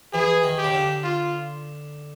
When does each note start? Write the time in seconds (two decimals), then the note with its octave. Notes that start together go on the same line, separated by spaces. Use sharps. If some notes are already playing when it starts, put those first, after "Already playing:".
0.13 E3 G#4
0.43 D#3
0.58 G4
0.64 C#3
0.73 D3
1.04 F4